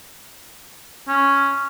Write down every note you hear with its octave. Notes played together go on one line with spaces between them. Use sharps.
C#4